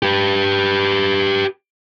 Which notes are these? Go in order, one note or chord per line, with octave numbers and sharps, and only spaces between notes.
G4 B4